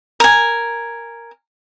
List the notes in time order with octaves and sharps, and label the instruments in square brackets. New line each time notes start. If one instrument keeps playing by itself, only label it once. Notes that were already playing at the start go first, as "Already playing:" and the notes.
[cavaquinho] A#4 G#5